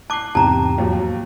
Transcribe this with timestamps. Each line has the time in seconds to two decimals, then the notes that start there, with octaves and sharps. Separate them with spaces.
0.10 A5 D6 F#6 C7
0.35 E2 G#2 C3 G5 A5 A#5
0.78 D#2 F3 F#3